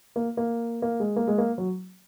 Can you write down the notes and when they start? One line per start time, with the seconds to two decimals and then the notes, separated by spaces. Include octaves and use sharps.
0.16 A#3
0.37 A#3
0.82 A#3
1.00 G#3
1.16 A#3
1.28 G#3
1.38 A#3
1.58 F#3